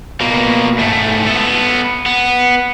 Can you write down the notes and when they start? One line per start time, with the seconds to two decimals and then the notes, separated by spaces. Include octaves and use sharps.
0.21 B2 A#3
0.78 G#2 A3
1.27 B3 A4
2.06 B3